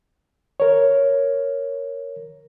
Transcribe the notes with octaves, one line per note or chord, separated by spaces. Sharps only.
A#4 C#5